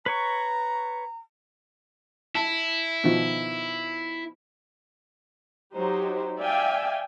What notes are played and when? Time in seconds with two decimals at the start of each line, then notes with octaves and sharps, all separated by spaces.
0.06 B4 C#5 A#5 C#6
2.35 E4 A5
3.04 B2 D#3 F3
5.76 F#3 D#4 G4 C5
6.39 D5 E5 F5 G5 G#5